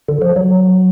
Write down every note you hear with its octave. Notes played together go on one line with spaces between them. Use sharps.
D3
F3
F#3